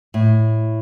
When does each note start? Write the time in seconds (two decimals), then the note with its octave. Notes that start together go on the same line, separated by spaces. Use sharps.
0.14 A2